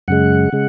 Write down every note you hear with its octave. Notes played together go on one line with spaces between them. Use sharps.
F#2 C#3 G#3 F#5
C#3 G#3